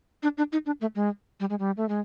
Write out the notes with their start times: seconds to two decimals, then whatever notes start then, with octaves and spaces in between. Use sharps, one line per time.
0.23 D4
0.38 D4
0.52 D#4
0.66 D4
0.81 A3
0.95 G#3
1.40 G3
1.50 G#3
1.59 G3
1.77 A3
1.89 G#3